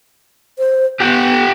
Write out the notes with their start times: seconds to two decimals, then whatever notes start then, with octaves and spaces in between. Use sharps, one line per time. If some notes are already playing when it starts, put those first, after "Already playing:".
0.59 C5
1.00 B3 G4 F#5